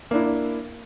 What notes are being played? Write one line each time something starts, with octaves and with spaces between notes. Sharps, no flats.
A#3 D4 E4